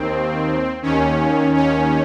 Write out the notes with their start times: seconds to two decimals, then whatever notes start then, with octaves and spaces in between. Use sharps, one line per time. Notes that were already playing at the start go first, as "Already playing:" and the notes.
Already playing: D#2 D#3 C4
0.82 D#2 D#3 C#4
1.55 C#4